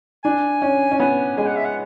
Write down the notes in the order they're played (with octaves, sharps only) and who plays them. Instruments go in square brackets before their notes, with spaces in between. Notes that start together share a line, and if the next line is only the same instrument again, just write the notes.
[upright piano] D4 [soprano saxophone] G#5
[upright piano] C#4
C#4
[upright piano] B3 [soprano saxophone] G#5
[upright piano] G#3 [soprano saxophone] G#5
[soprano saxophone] F#5
E5
F#5